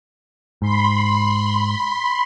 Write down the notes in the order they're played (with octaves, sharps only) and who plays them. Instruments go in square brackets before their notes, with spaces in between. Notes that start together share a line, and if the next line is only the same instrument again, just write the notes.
[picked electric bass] G#2 [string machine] B5 C6